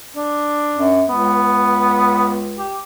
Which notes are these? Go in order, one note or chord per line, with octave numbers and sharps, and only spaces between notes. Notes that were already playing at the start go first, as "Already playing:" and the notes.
D4
F#2
C#2 B3
G4